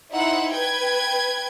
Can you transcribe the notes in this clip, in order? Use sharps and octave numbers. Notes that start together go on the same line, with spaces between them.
D#4 E4 C5 F#5
B4 G5 G#6